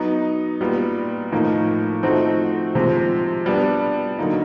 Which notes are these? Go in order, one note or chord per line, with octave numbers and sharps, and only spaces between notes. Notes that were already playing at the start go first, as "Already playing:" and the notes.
Already playing: F#3 B3 D#4
A#2 G3 B3
A2 F3 A#3 D#4
F3 A3 C4 D#4 F#4
C3 F3 G#3 C4
G3 B3 D4
D3 F#3 A#3 D#4